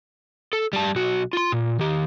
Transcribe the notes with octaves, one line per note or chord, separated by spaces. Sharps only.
A4
G3 A5
B1 F#4
F4 C6
A#2
D#3 G4